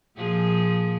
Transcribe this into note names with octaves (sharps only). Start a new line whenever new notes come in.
A#2 F3 G#4